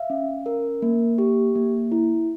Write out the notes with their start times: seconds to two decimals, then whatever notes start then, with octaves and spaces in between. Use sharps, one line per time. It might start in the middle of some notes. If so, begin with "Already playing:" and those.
Already playing: E5 F5
0.10 C#4
0.46 A#4
0.82 A#3
1.18 G4
1.55 A#3
1.92 E4